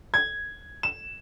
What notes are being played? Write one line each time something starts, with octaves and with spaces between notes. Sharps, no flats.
G#6
E7